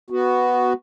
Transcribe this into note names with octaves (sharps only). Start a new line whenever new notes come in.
B3 F#4